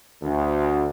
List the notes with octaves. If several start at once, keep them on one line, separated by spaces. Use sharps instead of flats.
D2